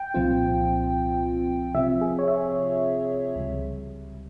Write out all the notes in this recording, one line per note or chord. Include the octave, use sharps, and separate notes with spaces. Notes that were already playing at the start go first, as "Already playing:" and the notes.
Already playing: G5
C2 A#2 F3 C4 F4
C3 F3 C4 F4 E5
G#4
C#5
E5
C#2 C3 G3